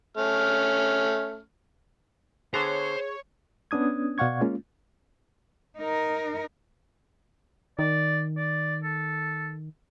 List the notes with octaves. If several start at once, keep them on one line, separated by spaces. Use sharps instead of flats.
A3 C#4 F6
D3 B3 G#4 C5 C#5 A#5
B3 C#4 D4 D#6 G#6
B2 D5 F5 F#5 C#6 G#6
G#3 A#3 C#4 F4
D#4 A#4
D#3 D5
D5
A4